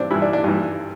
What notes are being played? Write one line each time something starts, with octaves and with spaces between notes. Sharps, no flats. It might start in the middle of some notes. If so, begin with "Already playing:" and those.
Already playing: G2 E3 C4 D4
G2 E3 E4
D4
D4
G2 E3